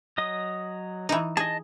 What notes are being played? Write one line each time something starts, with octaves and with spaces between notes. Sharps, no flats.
F#3 D#5 D#6
E3 D#4
G#4 D#5 A5